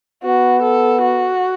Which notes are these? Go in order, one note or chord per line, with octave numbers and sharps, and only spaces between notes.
B3 F#4
A4
F#4